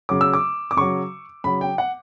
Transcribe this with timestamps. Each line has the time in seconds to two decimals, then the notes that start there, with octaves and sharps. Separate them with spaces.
0.09 C#3 F#3 D6
0.21 E6
0.34 D6
0.71 D6
0.77 C#3 F#3 C#6
1.44 C#3 F#3 B5
1.61 G5
1.78 F#5